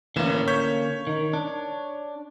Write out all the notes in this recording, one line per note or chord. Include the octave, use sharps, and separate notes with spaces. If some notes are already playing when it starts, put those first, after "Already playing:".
A1 D3 E3 A#3 C#4 E7
C#5 G6 B6
D#3
D4